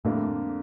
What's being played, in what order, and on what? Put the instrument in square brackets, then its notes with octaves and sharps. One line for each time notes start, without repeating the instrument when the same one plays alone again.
[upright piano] F2 D3 G3 A#3 D4 [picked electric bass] A2